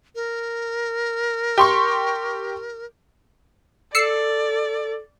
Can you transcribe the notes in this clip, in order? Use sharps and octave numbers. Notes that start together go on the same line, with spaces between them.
A#4
G4 C6 C#6
A4 D5 E6 C7 C#7